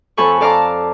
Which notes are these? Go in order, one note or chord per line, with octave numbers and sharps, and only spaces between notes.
F2 A4 C#5 G#5 B5 C#6
A4 D5 F5 A5 A#5 D6